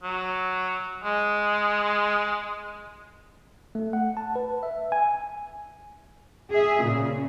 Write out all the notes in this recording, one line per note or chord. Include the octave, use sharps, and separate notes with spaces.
F#3
G#3
A3
F#5
A5
B4
E5
G#5
G#4 E5
A#2 C#3